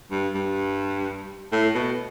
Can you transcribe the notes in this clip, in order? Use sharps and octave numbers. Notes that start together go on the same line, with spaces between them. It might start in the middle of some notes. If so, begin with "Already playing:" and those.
G2
G2
A2
B2